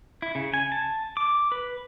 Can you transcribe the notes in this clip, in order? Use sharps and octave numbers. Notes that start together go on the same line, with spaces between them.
E4
C#3
G#5
A5
D6
B4